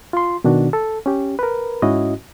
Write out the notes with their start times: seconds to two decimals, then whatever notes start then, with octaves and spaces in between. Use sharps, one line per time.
0.13 F4 C6
0.44 B2 D#3 D4 F#4
0.73 A4
1.06 C#4 G4
1.39 A#4 B4
1.82 G#2 C#4 E4 F#4 D#5